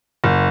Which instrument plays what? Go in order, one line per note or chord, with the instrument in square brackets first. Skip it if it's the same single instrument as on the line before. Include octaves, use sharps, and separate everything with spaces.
[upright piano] F#1